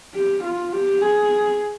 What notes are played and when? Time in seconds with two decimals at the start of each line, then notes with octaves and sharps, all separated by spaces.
0.14 G4
0.44 F4
0.73 G4
1.02 G#4